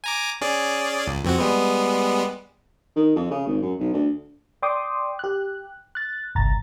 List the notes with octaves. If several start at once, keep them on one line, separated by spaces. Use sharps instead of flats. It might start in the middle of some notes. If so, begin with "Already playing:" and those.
G#5 A#5 D6
C#4 G#4 D5
C#2
F2 C4 F#4
G3 G#3 B3
D#3
F2
C#3
G#1
F#2
B1
D2
D5 G5 C6 D6 D#6
G4 F#6
F#6 A6
G1 C2 A#5 A6